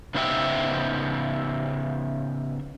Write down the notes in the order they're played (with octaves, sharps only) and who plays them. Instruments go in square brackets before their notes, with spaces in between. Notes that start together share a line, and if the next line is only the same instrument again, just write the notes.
[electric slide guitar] C#3 B3 D#4 C5 E5 G5